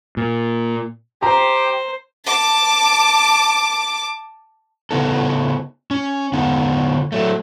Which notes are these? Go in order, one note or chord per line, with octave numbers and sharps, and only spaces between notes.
A#2
G4 C5 A#5
A5 D6
C#3 B3 D#4 A4
C#4
D3 B3 D#4
F#3 A3